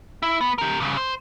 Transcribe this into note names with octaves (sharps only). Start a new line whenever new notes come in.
E4
B3
G4 A#4
G2 C#3
C5